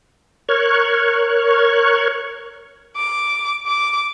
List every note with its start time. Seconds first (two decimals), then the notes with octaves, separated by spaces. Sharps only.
0.49 A#4 C#5 C#6 F6 F#6 G#6
2.97 D6
3.67 D6